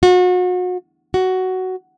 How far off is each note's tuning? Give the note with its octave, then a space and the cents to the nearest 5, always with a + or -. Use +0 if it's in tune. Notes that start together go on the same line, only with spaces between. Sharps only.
F#4 -35
F#4 +10